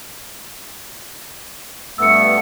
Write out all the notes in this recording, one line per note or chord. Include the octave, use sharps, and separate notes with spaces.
G2 A3 B3 E6 C#7